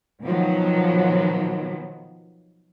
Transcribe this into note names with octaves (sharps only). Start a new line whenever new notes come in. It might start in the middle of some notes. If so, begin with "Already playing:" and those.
B2 D#3 F3 F#3